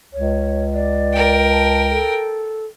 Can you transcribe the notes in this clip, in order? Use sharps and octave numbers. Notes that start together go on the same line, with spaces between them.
C#2 C#5
D5
A#4 G5
A5
A4